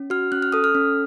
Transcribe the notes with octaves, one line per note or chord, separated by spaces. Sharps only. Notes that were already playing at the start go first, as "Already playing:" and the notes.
Already playing: C#4
F#4 F6
C#4 F#6
F6
A4 D#6
F6
C#4